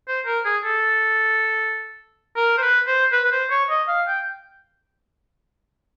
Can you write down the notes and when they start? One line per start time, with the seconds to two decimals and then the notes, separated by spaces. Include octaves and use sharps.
0.08 C5
0.26 A#4
0.45 G#4
0.65 A4
2.37 A#4
2.58 C5
2.62 B4
2.87 C5
3.12 B4
3.24 B4
3.32 C5
3.50 C#5
3.70 D#5
3.88 F5
4.07 G5